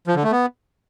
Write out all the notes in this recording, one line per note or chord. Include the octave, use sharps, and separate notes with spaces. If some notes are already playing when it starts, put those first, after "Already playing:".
F3
D3
A3
B3